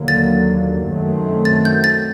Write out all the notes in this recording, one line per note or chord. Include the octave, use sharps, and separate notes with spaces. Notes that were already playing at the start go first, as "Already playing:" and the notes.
Already playing: D#2 D3 F#3 A#3
A6
F#2 D#3 F#3 A3 C4
A6
G6
A6